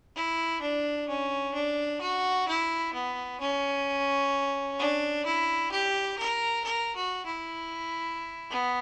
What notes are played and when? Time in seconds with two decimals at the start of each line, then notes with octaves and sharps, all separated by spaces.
0.16 E4
0.61 D4
1.08 C#4
1.54 D4
2.01 F#4
2.48 E4
2.93 B3
3.41 C#4
4.79 D4
5.26 E4
5.72 G4
6.18 A#4
6.65 A#4
6.96 F#4
7.26 E4
8.51 B3